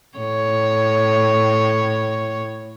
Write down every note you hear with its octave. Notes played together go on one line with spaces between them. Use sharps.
A2 C#5